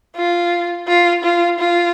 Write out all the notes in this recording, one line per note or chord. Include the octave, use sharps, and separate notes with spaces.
F4
F4
F4
F4